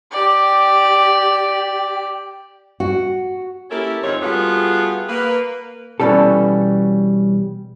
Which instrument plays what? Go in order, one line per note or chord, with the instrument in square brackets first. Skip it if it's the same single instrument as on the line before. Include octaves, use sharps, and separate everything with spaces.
[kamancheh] G4 D5
[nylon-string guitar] F#4
[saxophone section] A#3 C#4 E4 G4 A4 A#4
F2 G#2 D#3 C4 C#5
G3 A3 B3 F4 F#4 G#4
A#3 B4
[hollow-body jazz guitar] B2 E3 G3 C#4 A4